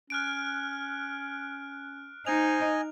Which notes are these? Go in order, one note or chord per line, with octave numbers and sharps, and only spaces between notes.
C#4 F6 F#6 D7
D#4 C5 D#5 G#5 F7